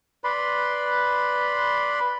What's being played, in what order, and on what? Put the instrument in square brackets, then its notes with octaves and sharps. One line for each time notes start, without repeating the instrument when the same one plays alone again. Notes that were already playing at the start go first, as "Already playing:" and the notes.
[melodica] B4 D5 B5 C6